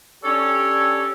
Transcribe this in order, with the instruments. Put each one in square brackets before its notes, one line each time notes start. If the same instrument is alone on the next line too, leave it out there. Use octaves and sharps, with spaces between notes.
[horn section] C#4 D4 G4 A4 C#5 D5